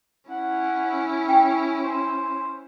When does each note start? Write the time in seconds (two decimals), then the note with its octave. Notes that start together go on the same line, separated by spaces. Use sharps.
0.30 C#4 E4 F#5
1.29 C#5 G5
1.84 C5